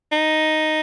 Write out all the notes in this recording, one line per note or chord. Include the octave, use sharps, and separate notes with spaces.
D#4